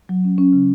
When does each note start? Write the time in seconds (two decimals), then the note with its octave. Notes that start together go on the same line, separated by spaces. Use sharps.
0.09 F#3
0.24 C#4
0.38 C#4
0.53 C#3